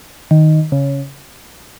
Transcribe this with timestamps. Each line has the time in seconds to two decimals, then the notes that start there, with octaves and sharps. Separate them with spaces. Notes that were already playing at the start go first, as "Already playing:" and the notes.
0.31 D#3
0.72 C#3